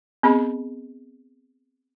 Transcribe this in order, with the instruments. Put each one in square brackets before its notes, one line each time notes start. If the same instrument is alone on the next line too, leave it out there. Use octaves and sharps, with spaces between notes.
[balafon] B3 C4 G#4 D#5 B5